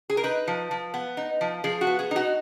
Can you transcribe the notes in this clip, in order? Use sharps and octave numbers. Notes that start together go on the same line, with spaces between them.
G#4
A#4
D#4 B4
F3
F3
B3
D#4
F3
F3 G#4
F#4
B3
G#4
D#4 F#4